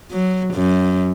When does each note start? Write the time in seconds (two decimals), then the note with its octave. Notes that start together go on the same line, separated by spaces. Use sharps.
0.12 F#3
0.54 F#2